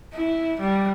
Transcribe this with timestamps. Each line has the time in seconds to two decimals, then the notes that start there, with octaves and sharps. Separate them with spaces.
0.13 E4
0.60 G3